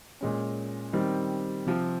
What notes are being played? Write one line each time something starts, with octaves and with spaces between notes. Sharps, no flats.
A#2 G#3 C#4
D#3 G3 C4
C3 F3 C4